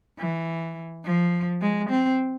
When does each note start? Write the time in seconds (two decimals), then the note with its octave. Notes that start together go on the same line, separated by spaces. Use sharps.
0.19 E3
1.05 F3
1.62 G#3
1.90 C4